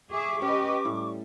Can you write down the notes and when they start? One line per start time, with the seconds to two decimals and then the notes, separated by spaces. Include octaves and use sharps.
0.11 G#4 E5 C#6 D6
0.42 C#4 G4 B4 D#5
0.85 A2 G3